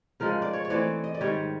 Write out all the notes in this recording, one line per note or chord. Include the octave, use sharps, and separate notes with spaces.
C#3 F3 G#3 A#4
D5
C#5
C#5
E3 A3 C4 D5
D#5
D5
G#2 D#3 G3 C#5